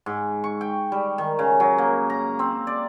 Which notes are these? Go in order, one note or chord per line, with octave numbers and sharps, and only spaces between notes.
G#2
C#6
G5
G3
D#3
C#3
F#3
A#3
A#5
C4
D5